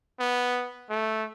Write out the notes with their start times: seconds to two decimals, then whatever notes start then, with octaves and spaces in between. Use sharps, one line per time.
0.20 B3
0.90 A3